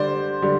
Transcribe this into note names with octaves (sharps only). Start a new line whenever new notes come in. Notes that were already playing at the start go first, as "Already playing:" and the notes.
Already playing: D3 G3 C5 D5
D3 G3